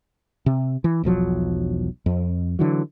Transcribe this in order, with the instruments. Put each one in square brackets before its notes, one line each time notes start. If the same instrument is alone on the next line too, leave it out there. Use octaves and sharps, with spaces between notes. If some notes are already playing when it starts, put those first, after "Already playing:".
[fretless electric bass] C3
E3
E1 B1 F3 F#3
F2
D3 E3 F#3